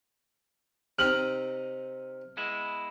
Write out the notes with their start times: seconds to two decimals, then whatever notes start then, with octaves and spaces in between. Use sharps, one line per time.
0.99 C3 C4 D#4 F6 F#7
2.37 G#3 B3 E4